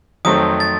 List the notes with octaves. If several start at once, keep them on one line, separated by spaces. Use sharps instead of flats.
F2 D#3 F#3 A3 C4 D#6
A6